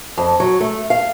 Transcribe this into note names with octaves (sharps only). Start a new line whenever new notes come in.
F2
F#3
A3
F5